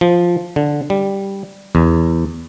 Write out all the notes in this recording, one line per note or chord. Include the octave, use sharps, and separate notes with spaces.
F3
D3
G3
E2